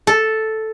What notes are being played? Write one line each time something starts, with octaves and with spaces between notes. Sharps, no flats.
A4